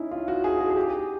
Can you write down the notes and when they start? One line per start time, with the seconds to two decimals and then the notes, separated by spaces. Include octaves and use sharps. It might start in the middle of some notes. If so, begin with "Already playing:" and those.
Already playing: C#4 D#4 E4
0.11 F4
0.28 F#4
0.44 G#4
0.60 F#4
0.70 G#4
0.76 G4